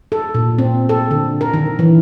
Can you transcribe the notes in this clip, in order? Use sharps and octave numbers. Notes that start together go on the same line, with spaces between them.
A4
A#2
C4
A4
D3
A#4
D#3
E3